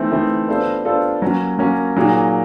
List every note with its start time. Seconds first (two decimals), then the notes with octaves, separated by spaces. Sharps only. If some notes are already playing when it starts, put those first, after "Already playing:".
Already playing: E3 A3 C4 D#4
0.11 E3 A3 C4 D#4
0.48 B3 D4 F4 A4 C5
0.85 B3 D4 F4 A4 C5
1.22 F#3 A#3 C#4
1.59 F#3 A#3 C#4
1.97 A#2 F#3 A#3 D#4 G#4